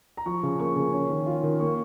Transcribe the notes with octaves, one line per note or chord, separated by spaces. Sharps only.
A#5
F3 C#6
C#3
A#3 C#6
C#3
C#4
D#3
F4
D#3
A#3 C#6